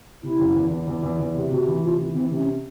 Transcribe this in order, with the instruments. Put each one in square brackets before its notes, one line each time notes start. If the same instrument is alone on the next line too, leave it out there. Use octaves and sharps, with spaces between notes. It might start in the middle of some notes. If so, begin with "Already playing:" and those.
[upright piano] C3 [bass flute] E4
[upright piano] F#1
E2
E2
E2
E2
E2
C3
[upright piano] C3 [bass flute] F#4
[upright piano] E3
[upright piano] C3 [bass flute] F4
[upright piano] E3
[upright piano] E3 [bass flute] C4
[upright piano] C3
[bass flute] C#4